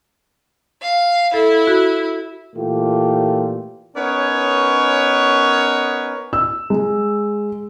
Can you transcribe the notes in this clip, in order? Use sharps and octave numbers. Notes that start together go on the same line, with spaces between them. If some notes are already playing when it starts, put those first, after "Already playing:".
F5
E4 A4
F#4
A#2 E3 A3 F4 G4
B3 C#4 D#4 A#4 C#5
E6
G#3